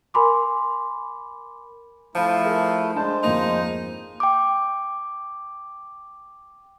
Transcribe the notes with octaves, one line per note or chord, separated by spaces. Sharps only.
A#4 G#5 B5 C6 D6
F3 A3 E4 F5 A5
G#4 A#4 E5
G#3 D4 C5 A5
F2 A#3 D#4 F7
G5 D6